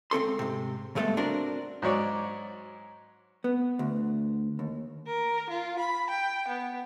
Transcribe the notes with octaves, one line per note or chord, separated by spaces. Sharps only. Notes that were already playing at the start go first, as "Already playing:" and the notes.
C#2 C4 A4 C6
G#2 C3
C#2 G2 G#3 A3 B3 A4
C4 D4 F#4 A#4
G#2 F#3 C#5 D5
B3
D2
D#2
A#4
F4
B5
G5
B3